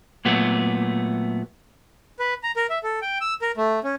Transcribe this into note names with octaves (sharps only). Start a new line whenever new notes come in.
A#2 F#3 A3 B3
B4
A#5
A#4
E5
A4
G5
E6
A#4
A3
C#4